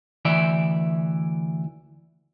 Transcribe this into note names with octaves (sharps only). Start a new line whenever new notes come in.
D2 E3 D5 E5